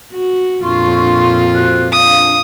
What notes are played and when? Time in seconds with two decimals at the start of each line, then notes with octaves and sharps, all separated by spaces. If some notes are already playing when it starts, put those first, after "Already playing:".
0.12 F#4
0.63 F2 A#2 D4 F4 C6 C#6
1.54 F#4 C5 F#6
1.93 D4 F5 D#6